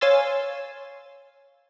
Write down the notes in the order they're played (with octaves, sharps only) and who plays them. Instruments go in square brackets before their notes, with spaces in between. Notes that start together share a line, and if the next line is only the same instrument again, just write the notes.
[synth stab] C#5 F5 G#5 C6 E6 A6